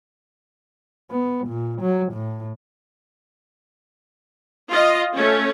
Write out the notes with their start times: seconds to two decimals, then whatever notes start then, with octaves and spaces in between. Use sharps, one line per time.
1.11 B3
1.48 A#2
1.82 F#3
2.13 A2
4.69 F4 D#5
5.14 A3 C#4